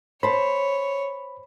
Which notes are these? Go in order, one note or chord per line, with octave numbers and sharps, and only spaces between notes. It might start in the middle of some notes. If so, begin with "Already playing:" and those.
C5 C#5 A5 B5